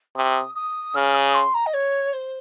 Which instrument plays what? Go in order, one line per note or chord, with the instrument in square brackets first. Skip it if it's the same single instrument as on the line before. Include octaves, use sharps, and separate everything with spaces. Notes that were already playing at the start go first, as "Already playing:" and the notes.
[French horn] C3 [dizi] D#6
[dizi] D#6
[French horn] C#3 [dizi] F6
[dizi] D#6
C6
A#5
D#5
C#5
C5